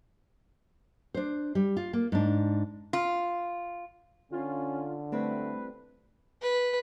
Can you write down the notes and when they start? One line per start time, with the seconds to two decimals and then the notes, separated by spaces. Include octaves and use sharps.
1.15 D4 C5
1.55 G3
1.77 F4
1.93 A#3
2.12 G#2 D4
2.93 F4
4.32 D3 C#4 F4
5.12 G3 A3 C4 E4 B4
6.42 B4